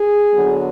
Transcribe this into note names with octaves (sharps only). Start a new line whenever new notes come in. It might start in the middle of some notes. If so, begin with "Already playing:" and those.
Already playing: G#4
D3 F#3 B3